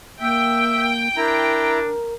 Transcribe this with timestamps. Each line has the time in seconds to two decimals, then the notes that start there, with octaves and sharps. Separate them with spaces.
0.20 A#3 E5 G5
1.17 D4 E4 A#4 A#5